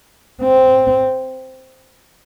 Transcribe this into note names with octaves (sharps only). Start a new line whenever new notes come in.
C4